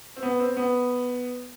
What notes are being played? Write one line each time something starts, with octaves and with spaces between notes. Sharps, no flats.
C4
B3
C4
B3